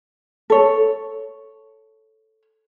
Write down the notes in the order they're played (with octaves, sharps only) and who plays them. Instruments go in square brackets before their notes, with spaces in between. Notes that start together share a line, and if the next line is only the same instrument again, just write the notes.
[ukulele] A4 C#5